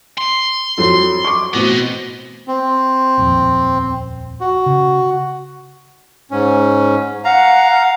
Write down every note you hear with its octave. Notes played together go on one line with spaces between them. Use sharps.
C6
F2 F#3 A4
C#6 D6
A1 B2 B3 C4 D#5
C4
D#1 A#1 F2
F#4
C#3
G#2 C#4
F5 F#5 A#5